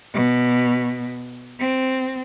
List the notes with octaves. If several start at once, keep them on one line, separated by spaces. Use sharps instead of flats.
B2
C4